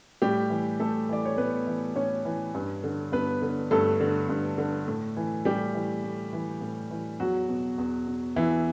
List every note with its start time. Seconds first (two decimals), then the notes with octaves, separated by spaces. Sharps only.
0.22 A2 G3 G4
0.50 E3
0.80 A2 A3 A4
1.09 E3 D5
1.25 C#5
1.38 A2 B3 B4
1.67 E3
1.96 A2 C#4 C#5
2.25 E3
2.55 G2
2.84 D3
3.12 G2 B3 B4
3.42 D3
3.71 G2 A3 A4
4.01 D3
4.29 G2
4.58 D3
4.88 A2
5.17 E3
5.45 A2 G3 G4
5.75 E3
6.04 A2
6.33 E3
6.61 A2
6.91 E3
7.20 E2 F#3 F#4
7.49 B2
7.78 E2
8.07 B2
8.36 E2 E3 E4